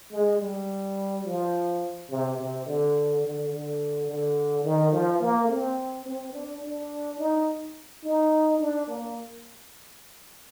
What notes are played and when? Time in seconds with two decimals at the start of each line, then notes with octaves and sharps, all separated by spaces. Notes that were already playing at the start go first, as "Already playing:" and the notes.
0.11 G#3
0.40 G3
1.25 F3
2.10 C3
2.38 C3
2.66 D3
3.23 D3
3.51 D3
4.07 D3
4.64 D#3
4.92 F3
5.21 A#3
5.48 C4
6.06 C4
6.33 D4
6.61 D4
7.18 D#4
8.04 D#4
8.60 D4
8.88 A#3